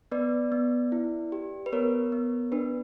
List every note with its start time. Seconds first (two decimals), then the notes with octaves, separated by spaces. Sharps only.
0.11 B3 B4 D5
0.52 B3
0.92 E4
1.32 G4
1.66 B4
1.72 B3 A#4 C#5
2.12 B3
2.52 D4 B4